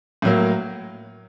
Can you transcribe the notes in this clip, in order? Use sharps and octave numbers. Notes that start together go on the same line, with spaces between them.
A2 F#3 A#3